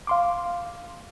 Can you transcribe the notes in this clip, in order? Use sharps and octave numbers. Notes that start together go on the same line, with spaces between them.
F5 C6 D6